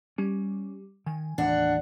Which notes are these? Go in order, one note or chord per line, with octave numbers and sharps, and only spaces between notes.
G3 C#4
D#3 G#5
D#2 A2 E3 D4 F#5